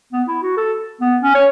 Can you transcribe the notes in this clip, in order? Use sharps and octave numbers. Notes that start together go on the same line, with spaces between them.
B3
E4
F#4
A4
B3
C#4
C#5